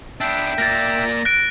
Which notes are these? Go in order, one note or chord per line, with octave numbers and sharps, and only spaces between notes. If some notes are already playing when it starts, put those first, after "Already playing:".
B3 D4 E5 G5 E6
A#3 D5 A6 A#6
F#6 A#6 D7